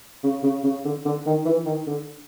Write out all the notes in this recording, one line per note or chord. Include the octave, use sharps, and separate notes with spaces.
C#3
C#3
C#3
D3
D3
D#3
E3
D#3
D3